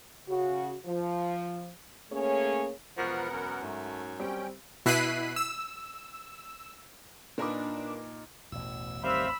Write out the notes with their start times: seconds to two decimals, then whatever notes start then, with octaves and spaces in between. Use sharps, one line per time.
0.28 C#3 F#4
0.86 F3
2.10 A3 A#3 C#4 G#4 C#5
2.98 E1 F3 B3 A#4 F#5 C#6
3.31 F#2
3.62 G#2 A3
4.20 G3 C4 C#4 G4 G5
4.86 B2 E4 F#6 B6 C7 D#7
5.36 E6
7.38 A#2 A#3 D4 D#4 A#4 B4 D6
8.52 A1 E2 B2 E6
9.04 D#3 G3 C4 G4 E5 F5 B5 E6